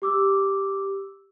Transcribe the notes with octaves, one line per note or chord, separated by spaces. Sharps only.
G4 D6 E6